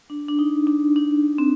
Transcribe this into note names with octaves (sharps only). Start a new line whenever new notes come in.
D4
D4
D#4
D4
D4
C4